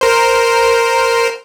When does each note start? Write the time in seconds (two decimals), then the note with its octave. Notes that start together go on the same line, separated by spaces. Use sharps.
0.01 A#4 C5